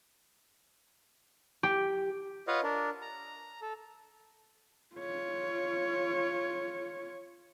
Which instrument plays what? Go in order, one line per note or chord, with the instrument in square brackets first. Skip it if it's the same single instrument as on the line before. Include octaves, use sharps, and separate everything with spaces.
[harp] G4
[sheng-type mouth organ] F4 B4 C#5 D#5 F5 F#5
D4 A#4
A#5
A4
[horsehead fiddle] F4 C#5